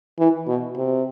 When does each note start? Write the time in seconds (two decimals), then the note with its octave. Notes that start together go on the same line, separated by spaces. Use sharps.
0.19 E3
0.47 B2
0.77 C3